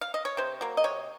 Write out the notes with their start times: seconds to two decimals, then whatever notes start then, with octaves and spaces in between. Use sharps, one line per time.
0.01 F5
0.14 D#5
0.25 C#5
0.37 C3 C5
0.61 F#3 A#3
0.77 D#5
0.84 C3 C#5